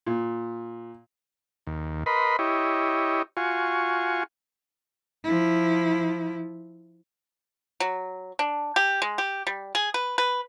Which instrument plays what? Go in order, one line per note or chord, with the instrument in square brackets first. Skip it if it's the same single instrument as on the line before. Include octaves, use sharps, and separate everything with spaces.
[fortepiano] A#2
[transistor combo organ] D#2
A#4 B4 D#5 B5 C6
E4 G4 C#5 D#5
F4 F#4 G#5 C#6
[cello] F3 E4
[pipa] F#3
D4
G4
G#3
G4
G3
G#4
B4
B4